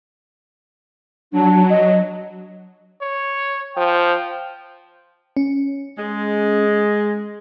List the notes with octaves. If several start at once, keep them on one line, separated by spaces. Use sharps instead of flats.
F#3 D4
D#5
C#5
F3 G5
C#4
G#3